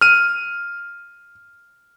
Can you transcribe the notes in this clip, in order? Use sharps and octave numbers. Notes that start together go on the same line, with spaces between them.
F6 D#7